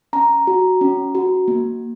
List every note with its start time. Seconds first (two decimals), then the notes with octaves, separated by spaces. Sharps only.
0.13 C#4 A#5
0.47 F#4
0.81 C#4
1.15 F#4
1.48 A#3